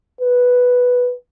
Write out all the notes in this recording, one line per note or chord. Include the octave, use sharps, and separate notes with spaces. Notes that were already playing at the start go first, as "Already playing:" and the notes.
B4